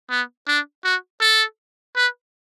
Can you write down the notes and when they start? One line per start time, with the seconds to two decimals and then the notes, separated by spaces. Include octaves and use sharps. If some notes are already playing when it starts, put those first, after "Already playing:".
0.10 B3
0.47 D4
0.84 F#4
1.21 A4
1.96 B4